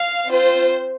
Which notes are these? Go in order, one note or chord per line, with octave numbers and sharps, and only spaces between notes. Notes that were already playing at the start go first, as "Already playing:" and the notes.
Already playing: F5
C4 F4 C5